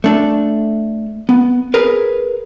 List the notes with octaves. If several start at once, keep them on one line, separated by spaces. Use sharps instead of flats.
A3 D4
B3
G#4 A#4 B4